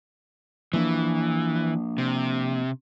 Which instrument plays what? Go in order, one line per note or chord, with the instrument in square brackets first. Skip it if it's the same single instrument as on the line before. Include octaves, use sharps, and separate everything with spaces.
[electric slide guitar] E3 [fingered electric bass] F3 A#3 D4
[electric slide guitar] C3